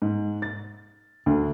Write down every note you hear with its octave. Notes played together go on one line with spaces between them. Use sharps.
G#2
A6
D2